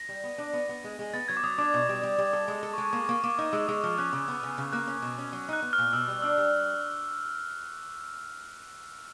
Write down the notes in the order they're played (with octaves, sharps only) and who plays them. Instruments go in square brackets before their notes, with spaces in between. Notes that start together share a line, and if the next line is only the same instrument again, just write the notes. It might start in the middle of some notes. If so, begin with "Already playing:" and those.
Already playing: [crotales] A#6
[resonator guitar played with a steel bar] G3
B3
D4
B3
B3
G#3
G#3
[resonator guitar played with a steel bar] B3 [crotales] A6
[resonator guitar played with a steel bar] F#3 [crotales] G#6
[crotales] D6
[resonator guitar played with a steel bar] F#3 [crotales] D#6
[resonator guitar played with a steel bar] D4 [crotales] D6
[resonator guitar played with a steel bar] B2
G3
G3
G3
[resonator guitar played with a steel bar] A4 [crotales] D6
[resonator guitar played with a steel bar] G#3
A4
[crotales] C#6
[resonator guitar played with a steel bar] G#3
[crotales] C#6
[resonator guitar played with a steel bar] A#3 [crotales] D6
[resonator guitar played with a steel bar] A#3 [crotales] C#6
[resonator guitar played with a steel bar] A#3 [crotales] D6
[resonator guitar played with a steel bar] D#4 [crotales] D#6
[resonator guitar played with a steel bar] G#3 [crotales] E6
[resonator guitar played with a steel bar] G#3 [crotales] D#6
[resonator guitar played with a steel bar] F3 [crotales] F6
[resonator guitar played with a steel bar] C#4 [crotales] F#6
[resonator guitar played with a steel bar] C#3
B3
C#3
C#3
[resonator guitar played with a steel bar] A#3 [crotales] F#6
[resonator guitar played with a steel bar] C#4
B2
C#4
F#3
[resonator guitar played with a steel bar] D#4 [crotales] F#6
[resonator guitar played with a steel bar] B3
[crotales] F6
[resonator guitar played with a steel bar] A#2
[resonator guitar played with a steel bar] B2 [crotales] E6
[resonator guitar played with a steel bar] G3
[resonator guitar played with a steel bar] D4 [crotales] E6
[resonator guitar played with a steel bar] G3